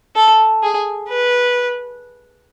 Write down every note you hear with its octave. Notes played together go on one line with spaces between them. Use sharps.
A4
G#4
B4